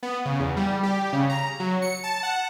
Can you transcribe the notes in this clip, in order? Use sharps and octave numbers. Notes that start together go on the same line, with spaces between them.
B3
C#3
E2
G3
G4
C#3
A#5
F#3
C#7
A5
F#5